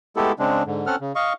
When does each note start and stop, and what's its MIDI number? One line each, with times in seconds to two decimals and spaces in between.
0.16 0.32 56
0.16 0.32 57
0.16 0.32 59
0.16 0.32 64
0.16 0.32 67
0.16 0.32 69
0.39 0.63 49
0.39 0.63 56
0.39 0.63 60
0.39 0.63 62
0.66 0.86 44
0.66 0.86 50
0.86 0.96 60
0.86 0.96 61
0.86 0.96 69
0.86 0.96 78
0.86 0.96 89
1.01 1.12 49
1.15 1.33 75
1.15 1.33 77
1.15 1.33 85